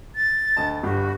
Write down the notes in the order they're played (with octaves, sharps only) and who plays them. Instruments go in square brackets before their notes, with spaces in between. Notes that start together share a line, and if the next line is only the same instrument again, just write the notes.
[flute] A6
[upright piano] D2 D#5 A5
[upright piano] G1 G2 G4 [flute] F#4